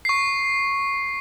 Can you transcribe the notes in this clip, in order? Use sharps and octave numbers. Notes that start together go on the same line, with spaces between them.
C#6 C7